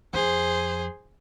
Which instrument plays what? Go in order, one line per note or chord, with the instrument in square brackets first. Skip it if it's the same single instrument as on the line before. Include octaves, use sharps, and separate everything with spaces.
[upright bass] F2 [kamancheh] G#4 C5